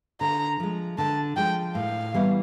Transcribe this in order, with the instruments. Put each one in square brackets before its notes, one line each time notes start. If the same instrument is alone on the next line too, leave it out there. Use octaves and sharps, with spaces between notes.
[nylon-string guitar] D3 [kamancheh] A#5
[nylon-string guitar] F3 G#3
[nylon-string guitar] D3 [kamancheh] A5
[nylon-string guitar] F3 G#3 [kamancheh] G5
[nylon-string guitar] A2 [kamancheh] F5
[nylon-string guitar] E3 G3 B3 E4